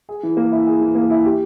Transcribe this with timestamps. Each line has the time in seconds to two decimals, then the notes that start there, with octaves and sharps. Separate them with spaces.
0.09 G#4
0.23 E3
0.37 A#3
0.52 E4
0.67 G#4
0.81 E3
0.95 A#3
1.10 E4
1.25 G4